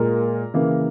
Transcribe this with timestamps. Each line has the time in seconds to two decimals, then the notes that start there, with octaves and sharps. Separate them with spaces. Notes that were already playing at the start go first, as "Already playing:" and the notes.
Already playing: A#2 G#3 A#4
0.54 C#3 E3 A#3